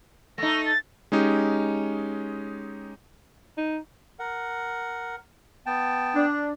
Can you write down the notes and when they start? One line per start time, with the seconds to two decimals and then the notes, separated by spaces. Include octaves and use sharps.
0.38 A3 D#4 A#6
0.66 A6
1.12 G#3 C#4 D#4 G4
3.57 D#4
4.19 A#4 F#5
5.66 B3 G5 A5
6.15 D4